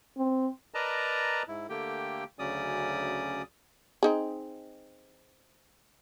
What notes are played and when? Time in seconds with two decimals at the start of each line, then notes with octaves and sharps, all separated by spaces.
0.17 C4
0.74 A#4 B4 D5 D#5 A5 A#5
1.48 G#2 E4
1.69 D3 A3 A#3 G4 G5
2.39 D2 C#3 F#3 C#4 D5 D#6
4.03 C4 D#4 G#4